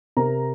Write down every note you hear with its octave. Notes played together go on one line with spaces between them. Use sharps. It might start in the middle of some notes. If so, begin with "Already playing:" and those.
C3 A#4 A#5